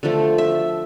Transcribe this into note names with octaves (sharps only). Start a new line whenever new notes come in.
D3 F3 A3
E5